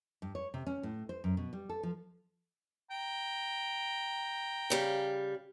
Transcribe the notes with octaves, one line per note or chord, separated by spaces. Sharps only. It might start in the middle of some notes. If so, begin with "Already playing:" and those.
G2
C#5
C3
C#4
A2
C5
F#2
B2
G3
A4
F3
G5 A#5
C#3 G3 F5